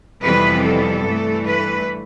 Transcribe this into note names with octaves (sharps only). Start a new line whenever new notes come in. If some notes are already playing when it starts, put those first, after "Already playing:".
F2 C3 E3 G3 B3 B4
A4
G2 E3 A3
B4